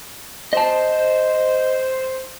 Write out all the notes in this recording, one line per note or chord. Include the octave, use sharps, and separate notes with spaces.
C5 D#5 A5